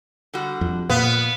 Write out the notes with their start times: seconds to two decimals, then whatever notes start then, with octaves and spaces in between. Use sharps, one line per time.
0.34 D3 G3 F#4
0.61 F2
0.90 A#2 B3 F5